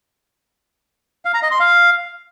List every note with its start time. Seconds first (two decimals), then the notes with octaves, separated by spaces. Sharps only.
1.25 F5
1.34 A#5
1.42 D#5
1.51 C6
1.60 F5